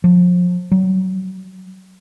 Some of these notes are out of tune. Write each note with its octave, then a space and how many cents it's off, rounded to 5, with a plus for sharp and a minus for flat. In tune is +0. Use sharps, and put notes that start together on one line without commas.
F3 +30
F#3 +25